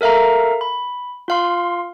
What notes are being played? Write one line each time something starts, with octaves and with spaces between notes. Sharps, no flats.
A4 A#4 E5 F5 A#5
B5
F4 F5 C6